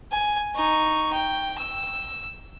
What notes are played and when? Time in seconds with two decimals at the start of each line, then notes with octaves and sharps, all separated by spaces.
0.12 G#5
0.55 D#4 C#6
1.13 G5
1.58 E6